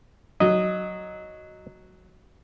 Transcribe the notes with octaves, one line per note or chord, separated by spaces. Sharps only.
F#3 D#5